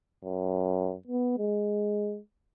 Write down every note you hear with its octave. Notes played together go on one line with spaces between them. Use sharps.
F#2
B3
G#3